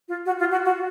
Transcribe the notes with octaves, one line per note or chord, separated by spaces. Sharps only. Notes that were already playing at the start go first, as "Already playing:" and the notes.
F4
F#4
F4
F#4
F#4